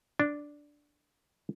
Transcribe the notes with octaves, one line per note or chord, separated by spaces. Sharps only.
D4